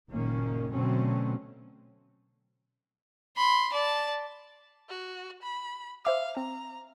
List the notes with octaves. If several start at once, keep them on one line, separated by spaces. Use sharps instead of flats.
F#1 A#2 D#3 A#3 C#4
B2 D3 F#3 A3 C4 C#4
B5 C6
D5 A5
F#4
B5
C5 E5 F5 D6
C4 A#5